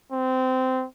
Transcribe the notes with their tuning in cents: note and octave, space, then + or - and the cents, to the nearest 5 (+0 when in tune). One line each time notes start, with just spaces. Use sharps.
C4 -20